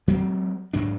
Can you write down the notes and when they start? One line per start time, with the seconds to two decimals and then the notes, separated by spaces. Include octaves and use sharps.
0.08 F#3 G#3 C4
0.73 G#2 F#3 D4